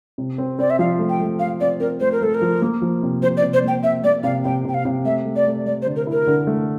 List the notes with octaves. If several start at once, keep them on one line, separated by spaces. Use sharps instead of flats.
C3
C4
C4 D5
E5
F3 F5
A3
G5
A3
A3 F5
C4 D5
C4 A#4
A3 C5
A#4
A3 A4
A#4
F3
A#3
F3
C3
F3 C5
D5
C3
C5
A#3 G5
C3 E5
A#3 D5
C3 F5
C3 G5
C3 G5
F5
C3
A3 E5
A3
D5
A3
A3 D5
C5
D3
A#4
E4
A#4
D3
A3